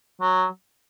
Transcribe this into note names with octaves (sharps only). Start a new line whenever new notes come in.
F#3